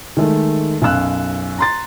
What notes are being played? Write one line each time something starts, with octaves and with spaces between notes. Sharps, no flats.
D#3 G#3 A3
B1 F#2 F5 E6 F#6
A#5 C6 A6